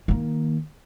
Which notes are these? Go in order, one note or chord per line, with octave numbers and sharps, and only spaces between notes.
D#3 A#3